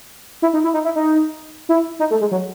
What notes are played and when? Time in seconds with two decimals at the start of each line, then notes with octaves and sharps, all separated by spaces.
0.42 E4
0.54 D#4
0.64 E4
0.74 D#4
0.85 E4
0.96 D#4
1.69 E4
1.99 D#4
2.11 A3
2.21 G#3
2.31 F#3